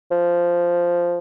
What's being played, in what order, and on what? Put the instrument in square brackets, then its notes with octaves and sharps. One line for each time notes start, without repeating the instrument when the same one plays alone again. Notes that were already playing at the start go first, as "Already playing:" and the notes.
[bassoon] F3